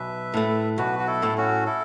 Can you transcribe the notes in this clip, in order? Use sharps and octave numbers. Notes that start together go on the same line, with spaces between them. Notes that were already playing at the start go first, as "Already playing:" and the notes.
Already playing: B1 B4 E5
A2 A3
B1 F#4 B4
F#4
E4 A4
A2 A3
C#4 F#4
E4 A4